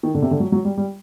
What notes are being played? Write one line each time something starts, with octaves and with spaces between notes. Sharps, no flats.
D#3
D3
C3
D3
F#3
F#3
G3
G3